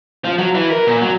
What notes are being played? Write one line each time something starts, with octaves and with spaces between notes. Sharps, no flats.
F3
F#3
E3
A#4
A#2
F#3